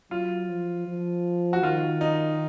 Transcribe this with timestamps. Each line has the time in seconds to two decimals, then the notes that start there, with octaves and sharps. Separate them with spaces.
0.11 F#3 F4
0.49 F3
0.87 F3
1.53 F#4
1.63 D#3 F4
2.01 D#4